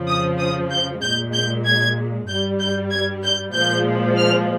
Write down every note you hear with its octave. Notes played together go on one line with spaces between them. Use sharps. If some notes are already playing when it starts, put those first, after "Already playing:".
Already playing: F2 C#3 F3
D#6
D#6
G6
A#2 G#3 G6
G6
G#6
G2 G3 G6
G6
G#6
G6
A#2 F3 G#3 G6
F6